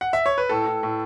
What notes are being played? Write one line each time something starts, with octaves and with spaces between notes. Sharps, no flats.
F#5
E5
C#5
B4
A2 A4
A2
A2